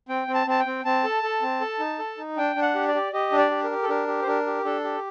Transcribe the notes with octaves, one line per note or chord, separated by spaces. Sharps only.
C4 G5
C4
A5
C4 A5
G5
C4
C4 A5
A4
A4
C4
A4
D#4
A4
D#4
D4 G5
D4
F#5
G4
D5
G4
G4 D#5
D4
D5
G4
A#4
G4
A4
D4 A#4
G4
C5
D4 A#4
G4
D4 A4
G4